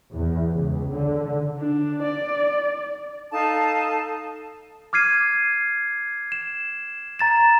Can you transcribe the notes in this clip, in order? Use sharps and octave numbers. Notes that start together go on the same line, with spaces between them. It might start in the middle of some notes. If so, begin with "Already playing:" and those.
E2
C#2
D3
D4
D5
D#4 A4 F5 A5
D6 F6 G#6 C7 D#7
E7
A#5 A6 E7